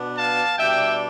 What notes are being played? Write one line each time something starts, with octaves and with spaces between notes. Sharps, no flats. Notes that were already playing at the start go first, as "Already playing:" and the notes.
Already playing: B2 B3 D4
F5 A5
B2 G3 D4 E5 G5